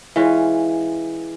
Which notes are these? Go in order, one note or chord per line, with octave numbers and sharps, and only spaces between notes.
E3 G#3 C#4 F4